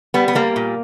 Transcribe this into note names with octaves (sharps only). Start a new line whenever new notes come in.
G3 B3
B3
G3 A#3
A#2